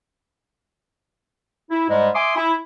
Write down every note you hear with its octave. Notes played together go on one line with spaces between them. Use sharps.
E4
G#2 G3 G#3
E5 G#5 C6 D6 D#6
E4